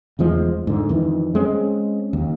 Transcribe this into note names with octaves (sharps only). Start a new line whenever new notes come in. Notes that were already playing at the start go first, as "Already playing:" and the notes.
F1 E2 F3 G#3
G#2 D3
F2 D#3 E3
G#3 C4 C#4
D#2